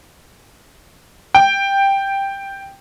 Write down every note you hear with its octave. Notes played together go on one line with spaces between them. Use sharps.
G5